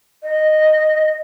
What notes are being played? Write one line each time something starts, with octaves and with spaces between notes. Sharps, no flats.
D#5